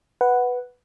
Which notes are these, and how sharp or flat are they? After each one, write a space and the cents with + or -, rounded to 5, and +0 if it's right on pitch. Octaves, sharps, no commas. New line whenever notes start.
B4 +0 F#5 +0